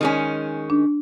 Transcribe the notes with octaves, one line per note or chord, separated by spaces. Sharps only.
D#3 G#3 C#4
D4